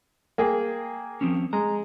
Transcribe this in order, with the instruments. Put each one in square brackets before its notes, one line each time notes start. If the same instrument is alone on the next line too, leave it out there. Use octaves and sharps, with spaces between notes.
[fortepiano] A#3 G#4 G5
[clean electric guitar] F3 C4 C#4
[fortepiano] G#3 [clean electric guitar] A#5